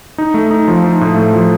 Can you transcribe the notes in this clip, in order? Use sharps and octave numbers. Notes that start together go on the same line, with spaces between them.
D#4
A3
D#4
F3
D#4
A2
A3
F3